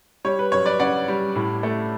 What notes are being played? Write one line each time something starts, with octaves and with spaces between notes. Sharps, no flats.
G3 C#5
B4
F#2 C#5
B4 D5
C#3 D5 F#5
G3
A2
A3